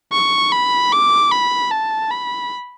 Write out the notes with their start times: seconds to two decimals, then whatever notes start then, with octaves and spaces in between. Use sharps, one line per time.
0.13 C#6
0.53 B5
0.93 D6
1.32 B5
1.72 A5
2.11 B5